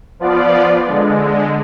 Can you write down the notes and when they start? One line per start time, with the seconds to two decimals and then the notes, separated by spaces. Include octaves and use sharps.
0.19 F3 B3 F4 D5
0.86 D3 G#3